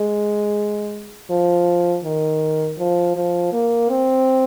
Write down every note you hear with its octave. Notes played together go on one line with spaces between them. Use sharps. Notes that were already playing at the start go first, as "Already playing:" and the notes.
Already playing: G#3
F3
D#3
F3
F3
A#3
C4